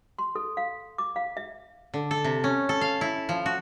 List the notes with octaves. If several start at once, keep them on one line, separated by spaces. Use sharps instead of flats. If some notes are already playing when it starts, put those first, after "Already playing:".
C6
A4
F5
D6
F5
E5
D3
A4
C3
C#4
A4
F5
E4
F3
F#4